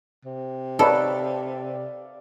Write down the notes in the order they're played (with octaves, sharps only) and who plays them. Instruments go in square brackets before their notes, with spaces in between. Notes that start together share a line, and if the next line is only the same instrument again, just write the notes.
[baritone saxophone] C3
[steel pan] D#4 B4 C#5 [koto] A4 [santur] D5 E5 F5